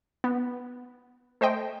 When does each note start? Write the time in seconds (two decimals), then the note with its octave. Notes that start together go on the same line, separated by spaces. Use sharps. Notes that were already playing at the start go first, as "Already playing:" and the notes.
0.24 B3
1.41 A3 C5 D#5 G5